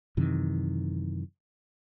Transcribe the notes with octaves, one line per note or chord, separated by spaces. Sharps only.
F#2 C3 D#3 E3